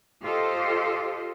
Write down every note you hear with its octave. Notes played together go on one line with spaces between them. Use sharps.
F4 G4 A4 C5 D#5